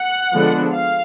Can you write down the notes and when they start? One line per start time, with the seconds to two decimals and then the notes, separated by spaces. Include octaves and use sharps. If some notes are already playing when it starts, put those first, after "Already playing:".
Already playing: F#5
0.32 D3 F3 G#3 B3 D4
0.73 F5